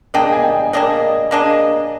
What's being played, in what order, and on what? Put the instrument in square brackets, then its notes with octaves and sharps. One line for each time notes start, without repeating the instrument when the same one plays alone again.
[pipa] A#3 D4 G#4 D#5 [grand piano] G5
[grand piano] G#5
G5
[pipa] A#3 D4 G#4 D#5
A#3 D4 G#4 D#5